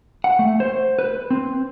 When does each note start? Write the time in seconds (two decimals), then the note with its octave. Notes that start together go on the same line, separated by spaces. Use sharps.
0.24 F#5
0.39 A3
0.60 C5
0.99 B4
1.30 C4